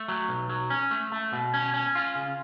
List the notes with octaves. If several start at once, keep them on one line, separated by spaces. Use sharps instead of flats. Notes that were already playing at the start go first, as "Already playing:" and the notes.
Already playing: A3
F#3
B1
F#3
C#4
A3
A3
B2
C#4
C#4
F4
C#3